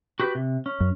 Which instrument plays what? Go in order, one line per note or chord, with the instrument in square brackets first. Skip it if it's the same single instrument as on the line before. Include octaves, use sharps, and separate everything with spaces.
[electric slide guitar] F#4 G4 B4
C3
C#4
[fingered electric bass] F#2